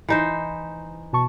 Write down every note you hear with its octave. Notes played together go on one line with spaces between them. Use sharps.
E3 D#4 C5
B2 A5 C#6